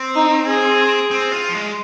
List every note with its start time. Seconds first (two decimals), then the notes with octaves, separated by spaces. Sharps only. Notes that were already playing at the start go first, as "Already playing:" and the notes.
Already playing: C4
0.15 D#4
0.47 G#4
1.11 C4
1.32 F4
1.49 F3
1.54 G#3